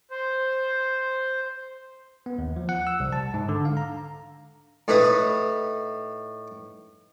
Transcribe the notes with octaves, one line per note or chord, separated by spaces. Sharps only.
C5
B3
D#2
F3
F#5
E6
C2
A5
G#2
D3
F5
A#5
A2 D#4 B4 D#6